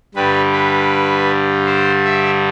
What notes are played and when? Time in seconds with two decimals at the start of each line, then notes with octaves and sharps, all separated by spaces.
0.15 G2 D3 G3 B4
0.52 B4
1.66 C5
2.04 E5